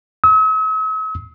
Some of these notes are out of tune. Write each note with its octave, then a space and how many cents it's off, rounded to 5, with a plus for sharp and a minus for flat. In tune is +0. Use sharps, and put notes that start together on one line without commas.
E6 -45